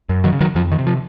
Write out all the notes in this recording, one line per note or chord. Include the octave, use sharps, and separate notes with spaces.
F#2
D#3 F#3
C#3
D#3 F#3
F2 F3
D#3
C3
F3